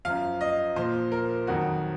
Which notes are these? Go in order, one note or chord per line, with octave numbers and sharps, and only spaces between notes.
F#2 F3 F5
D#5
A#2 F3 C5
A#4
F2 D#3 F#3 F#4